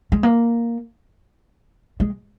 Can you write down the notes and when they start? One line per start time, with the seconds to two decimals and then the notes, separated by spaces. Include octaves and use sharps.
0.12 G#3
0.23 A#3
2.00 G#3